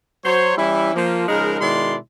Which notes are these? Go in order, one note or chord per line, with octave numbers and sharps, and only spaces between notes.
F#3 C5 C#5
E3 G3 C#4 E4
F3 A#3
C#3 F3 G#3 D#4 A#4
B2 D#3 G#3 E4 D5 C6